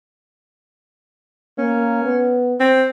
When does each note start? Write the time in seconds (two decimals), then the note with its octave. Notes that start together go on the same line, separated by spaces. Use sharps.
1.58 A#3 C#4
2.04 B3
2.60 C4